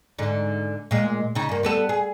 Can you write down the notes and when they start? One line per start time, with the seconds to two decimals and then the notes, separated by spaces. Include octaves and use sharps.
0.19 G#2 D3
0.91 A#2 G#3
1.35 C#3 D#4
1.49 G2 A#3
1.63 G3 B3 A4
1.89 G#4